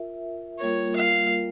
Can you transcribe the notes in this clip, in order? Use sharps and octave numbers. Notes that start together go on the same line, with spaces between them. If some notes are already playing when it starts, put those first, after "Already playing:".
Already playing: F4 A#4 E5
G3 A#3 F4 A#4 C#5
F5